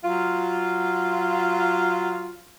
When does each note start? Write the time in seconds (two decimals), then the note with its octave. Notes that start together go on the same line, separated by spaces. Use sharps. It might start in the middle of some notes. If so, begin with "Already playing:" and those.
0.04 F#3 F4